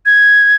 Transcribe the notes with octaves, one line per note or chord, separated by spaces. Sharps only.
G#6